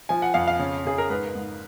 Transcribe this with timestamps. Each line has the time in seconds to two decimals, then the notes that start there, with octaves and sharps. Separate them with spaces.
0.09 F3 G#5
0.22 F#5
0.34 F2 F5
0.48 F5
0.59 C#3
0.85 C#3 G#4
0.98 A#4
1.10 G#2 B4
1.35 G#2